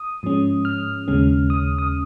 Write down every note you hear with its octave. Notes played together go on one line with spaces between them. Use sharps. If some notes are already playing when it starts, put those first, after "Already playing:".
Already playing: D#6
G#2 F3 G#3 C#4
F6
D#2 C#3 G#3 C#4
D#6
D#6